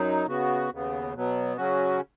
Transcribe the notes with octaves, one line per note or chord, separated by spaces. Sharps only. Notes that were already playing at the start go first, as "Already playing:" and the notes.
Already playing: F#2 F#3 D#4
C#3 B3 F#4
D#2 C#3 B3
B2 F#3 B3
C#3 F#3 C#4 F#4